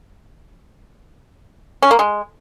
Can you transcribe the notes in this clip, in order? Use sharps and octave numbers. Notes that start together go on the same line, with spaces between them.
C#4
A#3
G#3